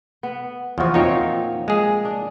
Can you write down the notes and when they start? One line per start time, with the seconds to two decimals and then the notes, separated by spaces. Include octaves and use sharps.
0.23 B3
0.78 E2 F3 F4 F#4
0.94 A#2 F3 C4 D#4 C#5
1.68 G#3 G#4
2.05 D4